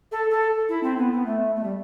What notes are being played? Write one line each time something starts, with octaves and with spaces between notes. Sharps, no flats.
A4
A4
E4
C4
B3
B3
A3
A3
G3